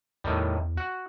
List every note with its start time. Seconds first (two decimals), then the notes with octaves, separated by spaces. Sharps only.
0.24 E2 A2 D#3 G3
0.77 F#4